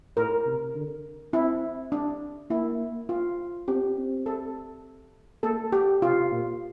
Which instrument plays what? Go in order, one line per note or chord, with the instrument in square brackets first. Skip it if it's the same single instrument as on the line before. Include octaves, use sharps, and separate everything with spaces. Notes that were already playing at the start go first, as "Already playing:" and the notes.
[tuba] A2 [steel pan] A#4
[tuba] C3
D3
[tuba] C4 [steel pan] E4
[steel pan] D4
[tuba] A#3 [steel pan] E4
[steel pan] F4
[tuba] C4 [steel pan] G4
[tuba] C4
[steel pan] A4
[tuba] A#3 [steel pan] A4
[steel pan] G4
[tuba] C3 [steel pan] F4
[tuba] A#2